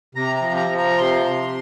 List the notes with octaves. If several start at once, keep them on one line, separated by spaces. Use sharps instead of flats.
C3 A#5
A#5
F3
A#5
F3
A#5
C3 C6
C3